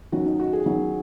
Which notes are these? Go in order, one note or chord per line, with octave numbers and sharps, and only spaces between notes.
D#3 F#3 C#4 F#4
D#4
F#4
G#4
D#3 F#3 C#4